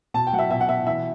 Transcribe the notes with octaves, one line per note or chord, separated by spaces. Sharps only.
B2 A5
G5
F#3 F#5
E5
B2 E5
F#5
B2 E5
E3 E5